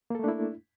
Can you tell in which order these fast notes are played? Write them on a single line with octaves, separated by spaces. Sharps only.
A#3 A4 A3 D4 E4